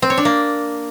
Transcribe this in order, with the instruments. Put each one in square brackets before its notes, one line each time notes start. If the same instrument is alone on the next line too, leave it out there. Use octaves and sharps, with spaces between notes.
[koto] C4
C#5
D4
A#3